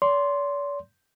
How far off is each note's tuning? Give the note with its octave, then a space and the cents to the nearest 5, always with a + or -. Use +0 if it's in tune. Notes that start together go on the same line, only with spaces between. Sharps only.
D5 -45 C6 +0